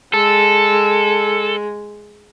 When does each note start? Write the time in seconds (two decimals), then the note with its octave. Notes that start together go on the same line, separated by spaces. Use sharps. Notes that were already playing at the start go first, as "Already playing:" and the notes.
0.14 G#3 A4